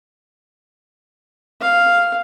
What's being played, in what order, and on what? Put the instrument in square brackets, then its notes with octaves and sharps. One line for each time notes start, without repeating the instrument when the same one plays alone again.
[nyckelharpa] F5